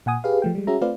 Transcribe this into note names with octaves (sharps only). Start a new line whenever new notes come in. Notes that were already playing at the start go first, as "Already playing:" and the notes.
A#2 F#5 G#5 D#6
G4 G#4 B4 F5
F3 A3 G5
G3 G#3
C#4 F#4 G#4 E5 A#5
A3 C4 F4 B4 D5 F5